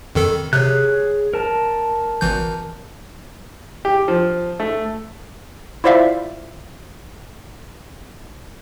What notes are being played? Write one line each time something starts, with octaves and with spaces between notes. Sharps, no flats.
F2 D#3 A4
C3 G#4 C#5 F#6
A#4 A5
G#1 E3 G6
G4
F3
A3
E4 F4 C5 D5 E5 F5